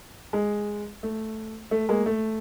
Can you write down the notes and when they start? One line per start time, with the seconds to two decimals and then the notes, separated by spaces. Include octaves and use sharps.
0.33 G#3
1.03 A3
1.71 A3
1.89 G#3 A#3
2.06 A3